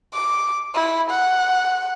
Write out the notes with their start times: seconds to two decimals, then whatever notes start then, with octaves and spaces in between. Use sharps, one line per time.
0.14 D6
0.75 E4
1.11 F#5